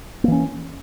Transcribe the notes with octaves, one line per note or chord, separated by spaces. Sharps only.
E3 A#3 C#4